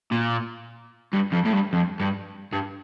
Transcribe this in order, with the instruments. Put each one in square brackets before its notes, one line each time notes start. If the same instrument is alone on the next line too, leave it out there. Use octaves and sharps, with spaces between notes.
[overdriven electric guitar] A#2
G2
F2
A2
G2
F2
G2
G2